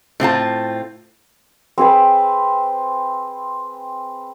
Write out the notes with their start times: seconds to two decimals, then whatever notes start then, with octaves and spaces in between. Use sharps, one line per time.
0.20 A2 C4 F4 A5
1.78 C4 G#4 B4